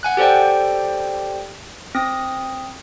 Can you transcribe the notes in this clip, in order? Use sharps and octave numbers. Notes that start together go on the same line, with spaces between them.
F#5 G#5 F#6
G4 A4 C5 D5 G5
C4 D#6 A#6